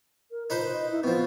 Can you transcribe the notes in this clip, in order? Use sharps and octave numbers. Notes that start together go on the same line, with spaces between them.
A#4
D#4 F4 B4 C5
D#5
E4
B2 F3 C4